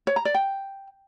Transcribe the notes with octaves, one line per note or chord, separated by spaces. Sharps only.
C#5
A#5
D5
G5